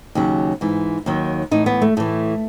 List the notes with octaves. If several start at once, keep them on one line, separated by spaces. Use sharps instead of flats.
D#2 C#3 F#3
G#2 E3
D#2 D#3 F#3
A2 E3 D#4
B3
A3
A2 E3 A3